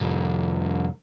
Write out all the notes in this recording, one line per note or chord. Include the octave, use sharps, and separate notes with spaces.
C2 F2